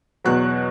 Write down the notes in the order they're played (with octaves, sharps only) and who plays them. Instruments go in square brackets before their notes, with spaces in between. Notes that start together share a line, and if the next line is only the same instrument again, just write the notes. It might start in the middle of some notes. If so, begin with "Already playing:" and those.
[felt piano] E2 B2 F#3 F#6